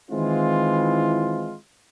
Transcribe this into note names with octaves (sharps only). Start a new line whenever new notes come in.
D#3 E3 G#3 C4 E4 F4